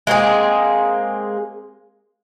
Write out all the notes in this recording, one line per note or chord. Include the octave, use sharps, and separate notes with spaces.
G#3 A#3 C4 G#4